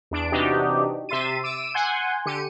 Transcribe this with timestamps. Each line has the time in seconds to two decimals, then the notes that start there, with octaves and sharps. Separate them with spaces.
0.11 E2 D4 D7
0.32 C3 E3 D4 D#4 F#4 G4
1.09 C3 E5 C6 A6 D#7
1.44 D6 E6 D7 D#7
1.74 F#5 G#5 C6 G6
2.26 D3 G4 C#7 D#7